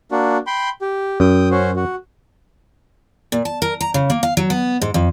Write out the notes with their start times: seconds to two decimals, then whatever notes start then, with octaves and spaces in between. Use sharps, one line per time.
0.12 A#3 D4 F#4
0.47 G5 B5 C6
0.82 G4
1.20 F#2 G5 D#6
1.51 C#4 F#4 C5
1.76 F#4
3.32 A#2
3.45 A5
3.62 A#4
3.81 A#5
3.94 C#3
4.10 A#3
4.23 F5
4.37 F#3
4.50 B3
4.82 G#2
4.94 F2